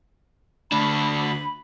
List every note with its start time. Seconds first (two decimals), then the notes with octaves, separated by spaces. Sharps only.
0.72 D2 D4 B5